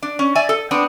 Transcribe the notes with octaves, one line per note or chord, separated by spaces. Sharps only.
D4
C#4
D5 E5 G#5
A4
B3 C4 D4